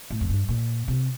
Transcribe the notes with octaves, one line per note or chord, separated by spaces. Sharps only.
A2
F2
G2
A#2
C3